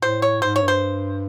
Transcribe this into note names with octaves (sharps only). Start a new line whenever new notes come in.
A2 C5
C#5
G#2 C5
C#5
G2
C5